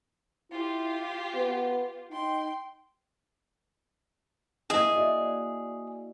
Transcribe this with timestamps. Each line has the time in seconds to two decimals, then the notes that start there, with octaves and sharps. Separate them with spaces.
0.51 E4 F4 G4
1.35 B3
2.11 D#4 G5 C6
4.70 A#3 E4 G#4 D#5
4.91 F#4 D5 E5